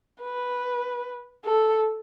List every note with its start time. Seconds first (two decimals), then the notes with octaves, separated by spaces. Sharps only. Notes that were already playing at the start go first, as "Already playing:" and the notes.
0.22 B4
1.45 A4